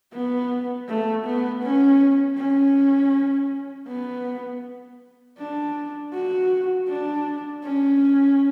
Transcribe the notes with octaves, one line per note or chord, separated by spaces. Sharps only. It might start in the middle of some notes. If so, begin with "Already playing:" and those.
B3
A3
B3
C#4
C#4
B3
D4
F#4
D4
C#4